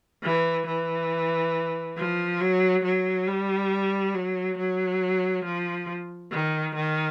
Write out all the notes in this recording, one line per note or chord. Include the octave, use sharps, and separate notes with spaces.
E3
E3
F3
F#3
F#3
G3
F#3
F#3
F3
D#3
D#3